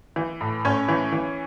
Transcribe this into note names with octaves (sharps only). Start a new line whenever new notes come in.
E3
A2
A2 C#4 C#5
E3
E3